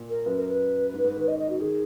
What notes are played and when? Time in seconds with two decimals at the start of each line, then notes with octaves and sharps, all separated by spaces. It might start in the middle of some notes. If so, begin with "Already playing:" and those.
Already playing: A#2
0.10 A#4
0.26 F#2 B4
0.37 A#4
0.48 B4
0.93 G#2
1.04 G#2
1.17 D#3
1.28 D#5
1.39 D#5
1.50 F#4
1.61 D#3 G#4